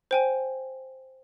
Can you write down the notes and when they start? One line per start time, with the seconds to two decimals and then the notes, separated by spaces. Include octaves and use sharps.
0.11 C5 G5 G#5